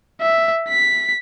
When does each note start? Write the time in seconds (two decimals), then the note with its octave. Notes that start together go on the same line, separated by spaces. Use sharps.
0.21 E5
0.69 B6